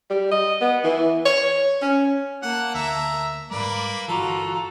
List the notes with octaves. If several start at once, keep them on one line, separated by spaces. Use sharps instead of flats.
G3
D#5
B3
E3
C#5
C#4
A#3 F#5 A5
D2 E5 A#5
G#2 G3 A#3 B4 D5
G1 E3 F4 F#4 A4 A#5